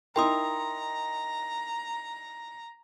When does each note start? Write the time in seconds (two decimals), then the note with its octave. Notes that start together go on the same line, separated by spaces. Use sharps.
0.16 D#4 E4 A#4 G5 A#5 C6 D#6